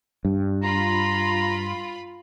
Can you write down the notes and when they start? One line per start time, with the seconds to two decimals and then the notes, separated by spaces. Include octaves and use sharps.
0.25 G2
0.63 F4 A#5 B5